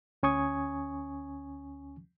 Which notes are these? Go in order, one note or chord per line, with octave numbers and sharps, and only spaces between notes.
D2 C#4 G#5 C#6 D#6 G#6